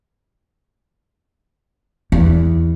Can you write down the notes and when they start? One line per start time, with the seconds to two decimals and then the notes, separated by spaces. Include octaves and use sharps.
2.12 E2